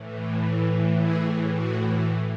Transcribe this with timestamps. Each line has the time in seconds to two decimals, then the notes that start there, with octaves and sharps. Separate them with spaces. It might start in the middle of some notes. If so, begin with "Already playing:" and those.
Already playing: A2 E3
0.97 G#4
1.54 F#4